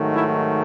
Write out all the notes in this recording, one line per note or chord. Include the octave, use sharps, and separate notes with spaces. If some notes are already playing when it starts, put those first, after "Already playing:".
Already playing: G#2 D#3 F#3 A3
E4